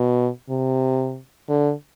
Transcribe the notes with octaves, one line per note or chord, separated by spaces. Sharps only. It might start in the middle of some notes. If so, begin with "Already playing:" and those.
Already playing: B2
C3
D3